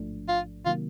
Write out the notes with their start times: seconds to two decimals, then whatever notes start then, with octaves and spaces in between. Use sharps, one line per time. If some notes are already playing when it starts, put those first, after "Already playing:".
Already playing: A1 G#2 F3 A3 D4
0.29 F4
0.66 C3 D#3 F#3 A#3 F4